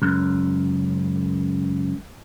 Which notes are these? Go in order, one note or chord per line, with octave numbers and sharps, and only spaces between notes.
C#2 F#2